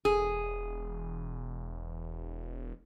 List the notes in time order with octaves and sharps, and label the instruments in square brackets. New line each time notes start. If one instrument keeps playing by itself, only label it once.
[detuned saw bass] E1 [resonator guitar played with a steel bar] G#4